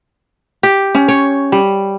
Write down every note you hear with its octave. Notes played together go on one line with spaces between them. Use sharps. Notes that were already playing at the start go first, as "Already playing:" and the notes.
G4
C#4
C#5
G3